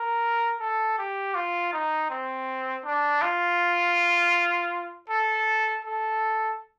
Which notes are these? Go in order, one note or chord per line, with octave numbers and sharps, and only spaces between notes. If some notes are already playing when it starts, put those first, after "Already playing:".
Already playing: A#4
A4
G4
F4
D#4
C4
D4
F4
A4
A4